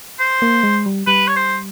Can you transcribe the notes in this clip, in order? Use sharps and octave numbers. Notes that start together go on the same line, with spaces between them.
C5
A#3
G#3
G3
G3 B4
C#5
C5